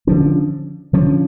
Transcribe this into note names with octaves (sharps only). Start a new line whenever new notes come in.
D3 F3 C#4
D3 F3 C#4